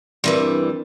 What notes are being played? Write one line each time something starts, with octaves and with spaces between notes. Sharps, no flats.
G2 E3 G3 C4 A#4
D4